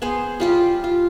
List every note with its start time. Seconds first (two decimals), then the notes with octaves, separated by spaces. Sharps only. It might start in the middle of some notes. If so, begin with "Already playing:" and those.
0.02 B3 G#4 C5
0.40 G3 F4 G4
0.84 F4